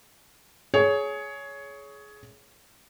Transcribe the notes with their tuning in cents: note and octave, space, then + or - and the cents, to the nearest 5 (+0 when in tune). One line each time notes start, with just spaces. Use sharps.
G#4 +20 C#5 +10